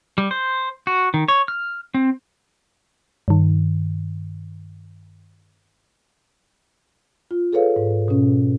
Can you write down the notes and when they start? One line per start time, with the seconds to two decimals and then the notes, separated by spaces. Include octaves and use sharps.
0.18 G3
0.31 C5
0.87 F#4
1.14 D#3
1.28 C#5
1.48 F6
1.94 C4
3.28 G2 D#3
7.31 F4
7.53 G#4 A4 B4 C#5 F5
7.76 G#2
8.08 B2 C#4